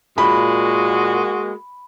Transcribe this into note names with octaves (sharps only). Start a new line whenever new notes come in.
A#2 G#3 A#3 F#4 B5